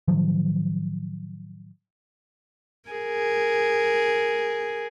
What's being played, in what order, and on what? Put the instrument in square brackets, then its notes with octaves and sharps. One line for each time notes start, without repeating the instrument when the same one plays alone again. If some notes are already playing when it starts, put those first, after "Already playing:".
[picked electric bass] A2 D#3 F3 F#3
[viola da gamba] G#4 A#4